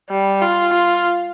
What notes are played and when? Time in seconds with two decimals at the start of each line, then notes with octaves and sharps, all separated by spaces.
0.10 G3
0.42 F4
0.74 F4